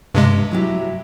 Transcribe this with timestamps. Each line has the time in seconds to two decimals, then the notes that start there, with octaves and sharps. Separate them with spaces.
0.15 G2 C3 G#3
0.52 F#3 E4 G4